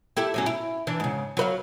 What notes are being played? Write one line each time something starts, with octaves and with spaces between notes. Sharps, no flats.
E4 G4 A4
A2 F#3 C#4
E4
E3 D4
G#2 C#3
F#3 B4 F5